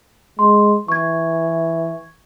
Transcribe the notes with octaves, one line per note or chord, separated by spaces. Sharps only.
G#3 C6
E3 C#6 G#6